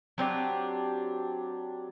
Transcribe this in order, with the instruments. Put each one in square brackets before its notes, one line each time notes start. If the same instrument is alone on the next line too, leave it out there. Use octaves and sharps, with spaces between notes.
[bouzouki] F#3 C4 D4 G4